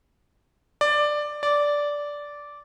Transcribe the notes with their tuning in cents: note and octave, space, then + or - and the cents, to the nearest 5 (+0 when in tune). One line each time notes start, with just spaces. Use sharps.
D5 +10
D5 -10